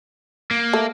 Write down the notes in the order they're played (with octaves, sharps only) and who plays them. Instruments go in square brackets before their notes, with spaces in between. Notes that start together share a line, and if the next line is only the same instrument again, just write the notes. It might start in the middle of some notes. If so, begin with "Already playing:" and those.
[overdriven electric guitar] A#3
[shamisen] A3